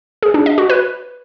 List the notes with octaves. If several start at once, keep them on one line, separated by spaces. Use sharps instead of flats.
G#4
D4
D#5
F#4
B4